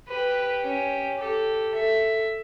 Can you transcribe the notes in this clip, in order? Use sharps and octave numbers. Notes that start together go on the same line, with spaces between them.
G4 B4
C#4
G4 A4
A4 E5